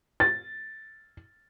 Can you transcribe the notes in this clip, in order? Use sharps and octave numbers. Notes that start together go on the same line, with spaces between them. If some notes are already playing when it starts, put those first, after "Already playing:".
A6